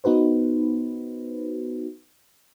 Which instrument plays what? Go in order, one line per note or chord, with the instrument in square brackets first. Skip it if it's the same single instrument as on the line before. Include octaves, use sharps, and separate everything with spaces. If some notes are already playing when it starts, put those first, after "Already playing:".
[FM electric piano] B3 D#4 F#4 B4 C5